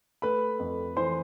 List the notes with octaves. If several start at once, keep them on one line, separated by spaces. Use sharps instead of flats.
A3 B4 B5
F2
E3 C5 C6